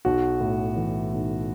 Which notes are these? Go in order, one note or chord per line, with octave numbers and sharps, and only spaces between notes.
B1 F#4
A2
E3
B1